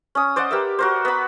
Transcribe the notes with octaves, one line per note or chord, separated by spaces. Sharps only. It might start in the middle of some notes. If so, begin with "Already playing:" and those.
C#4 D#6
C5 D5 D#5 F#5
G4 A#4 B4 E5
F#4 A#4 C5
B3 B5